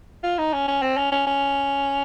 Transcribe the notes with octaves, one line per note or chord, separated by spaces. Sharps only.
F4
D#4
C#4
C#4
C4
C#4
C#4
C#4